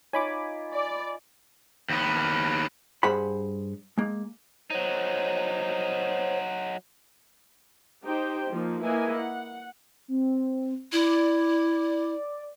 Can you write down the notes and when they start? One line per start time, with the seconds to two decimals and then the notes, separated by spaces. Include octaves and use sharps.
0.13 D#4 F4 C#5 G#5 B5 D6
0.73 D5
1.89 D#2 B3
3.03 G2 G#4 C5 F#5 B5
3.97 G#3 A#3
4.70 F#3 D#4 C5 C#5
8.04 D#4 G4 C5 G5
8.51 F3 A#3 D#4
8.83 A#3 E4 B4 D#5 G#5
9.17 F#5
10.08 C4
10.92 E4 D5